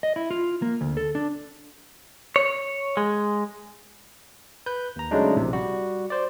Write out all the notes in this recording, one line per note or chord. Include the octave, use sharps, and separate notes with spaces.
D#5
E4
F4
A#3
D2
A4
D4
C#5
G#3
B4 G6
D#2 A#5
C#3 F#3 G#3 A3 D4 D#4
A#1 A2 C3
G3 F#4
C5 D5